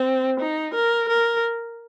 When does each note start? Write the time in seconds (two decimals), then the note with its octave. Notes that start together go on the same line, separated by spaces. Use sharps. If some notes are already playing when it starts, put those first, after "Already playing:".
Already playing: C4
0.40 D#4
0.74 A#4
1.09 A#4